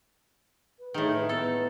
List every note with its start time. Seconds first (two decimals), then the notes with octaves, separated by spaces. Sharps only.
0.79 B4
0.94 A2 D#3 G#4
1.13 B4
1.29 B3 A4